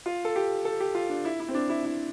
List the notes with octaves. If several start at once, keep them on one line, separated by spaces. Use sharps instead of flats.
F4
A4
G4
A4
G4
F4
D4
E4
E4
C4
D4
E4
E4